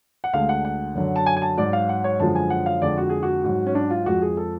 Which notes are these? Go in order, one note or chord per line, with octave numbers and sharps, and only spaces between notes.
F#5
D2 D3 G#3 F5
F#5
F#5
F#2 D3 F#3
A5
G#5
G#5
A5
G#2 F#3 D5
F5
F#5
C#5
F#2 D3 F3 G#3 A5
G#5
F#5
F5
F2 D3 G#3 D5
F#4
G#4
F#4
G#2 F#3
C#4
D4
F4
F2 F3 G#3 F#4
G#4
A4